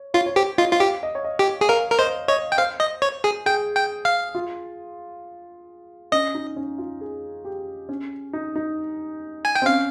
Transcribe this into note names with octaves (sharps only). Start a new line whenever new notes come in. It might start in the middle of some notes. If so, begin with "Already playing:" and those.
Already playing: C#5
F4 C#5
C#5
G4 C5
F4 D#5
F4
G4 F5
D#5
C#5
D#5
G4
G#4
A#4 F5
A#4
C5 D#5
C#5 D#5
G5
C5 F5
D#5
C#5
G#4
G#4 G5
G5
F5
F4
C#4 D#5
D#4
C#4
F4
G#4
G4
C#4
D#4
D#4
G#5
G5
C4
C#4 F5